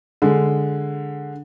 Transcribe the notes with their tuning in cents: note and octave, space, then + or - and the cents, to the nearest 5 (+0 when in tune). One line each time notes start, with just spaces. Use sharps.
D3 +0 G#3 +0